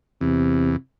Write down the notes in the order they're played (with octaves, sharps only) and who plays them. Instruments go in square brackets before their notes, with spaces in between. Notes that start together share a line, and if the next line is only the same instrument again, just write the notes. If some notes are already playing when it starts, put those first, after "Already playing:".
[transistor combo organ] E2 [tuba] C3